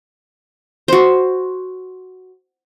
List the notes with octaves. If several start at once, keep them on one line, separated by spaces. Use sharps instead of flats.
F#4 C5